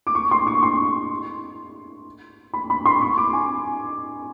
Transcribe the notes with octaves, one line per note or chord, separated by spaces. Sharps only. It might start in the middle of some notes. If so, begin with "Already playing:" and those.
D6
C#6
C6
C#6
C6
B5
B5
C6
C#6
D6
G#5